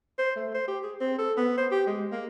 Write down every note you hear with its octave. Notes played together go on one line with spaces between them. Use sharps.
C5
A3
C5
G4
G#4
C4
A4
B3
C5
G4
G#3
A#3